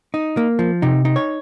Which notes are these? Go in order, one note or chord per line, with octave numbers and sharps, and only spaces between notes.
D#4
A#3
F3
C3 D#4
D#4
C#5